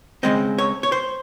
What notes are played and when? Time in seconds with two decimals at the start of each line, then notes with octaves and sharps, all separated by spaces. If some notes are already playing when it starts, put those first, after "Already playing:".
0.23 C#3 F3 G#3 C4 D#5
0.58 C#5
0.83 C#5
0.92 C5